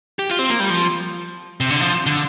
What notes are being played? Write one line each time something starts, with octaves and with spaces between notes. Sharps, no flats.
G4
F4
C4
A#3
G3
F3
C3
D3
F3
D3